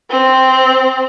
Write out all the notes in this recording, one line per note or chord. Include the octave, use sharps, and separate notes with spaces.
C4